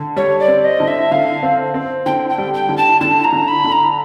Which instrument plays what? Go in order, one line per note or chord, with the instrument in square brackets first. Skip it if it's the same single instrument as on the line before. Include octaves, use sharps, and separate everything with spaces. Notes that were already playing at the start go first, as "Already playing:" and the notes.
Already playing: [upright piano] D3
[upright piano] G3 [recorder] C#5
[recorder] D5
[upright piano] C4
[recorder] D#5
[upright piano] D3
[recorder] E5
[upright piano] D3 [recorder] F5
[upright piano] C4
C4
[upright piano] D3 [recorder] G5
[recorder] G5
[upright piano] G3
[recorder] G5
[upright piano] D3
[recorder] A5
[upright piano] D3 [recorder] A5
[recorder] A#5
[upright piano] D3
[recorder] B5
[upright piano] D3
[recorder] A#5